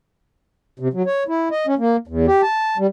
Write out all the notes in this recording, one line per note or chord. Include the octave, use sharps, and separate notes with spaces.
C3
F#3
C#5
E4
D#5
C#4
A#3
E2
G4
A5
G3